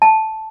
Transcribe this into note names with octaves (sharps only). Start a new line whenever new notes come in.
A5